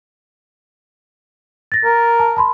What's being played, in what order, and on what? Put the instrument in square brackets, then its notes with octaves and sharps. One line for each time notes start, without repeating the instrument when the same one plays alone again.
[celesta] A6 A#6
[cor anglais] A#4
[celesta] A5
A5 B5 C6